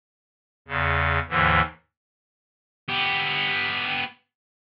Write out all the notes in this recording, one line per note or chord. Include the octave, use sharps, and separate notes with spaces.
E2 C#3
D#2 G#2 D3 E3
B3 G4